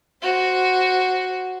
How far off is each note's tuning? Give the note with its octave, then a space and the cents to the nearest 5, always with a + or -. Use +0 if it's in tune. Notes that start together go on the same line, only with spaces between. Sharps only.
F#4 +0 C5 +0